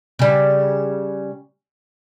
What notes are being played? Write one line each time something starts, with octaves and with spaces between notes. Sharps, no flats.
C#3 G3